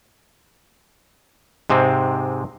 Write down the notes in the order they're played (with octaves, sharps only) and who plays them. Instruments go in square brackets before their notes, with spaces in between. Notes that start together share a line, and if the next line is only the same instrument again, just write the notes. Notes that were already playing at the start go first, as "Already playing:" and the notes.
[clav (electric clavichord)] G#2 C3 G#3 C4